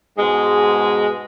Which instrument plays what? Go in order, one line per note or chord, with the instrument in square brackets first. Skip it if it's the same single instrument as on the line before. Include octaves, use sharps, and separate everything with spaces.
[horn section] G#2 B2 G#3